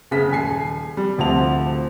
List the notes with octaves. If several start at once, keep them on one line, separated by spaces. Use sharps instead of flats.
F#1 C#3 G#4 B6
D#1 G#5 C7
G3
D1 D2 F3 C4 A5 F7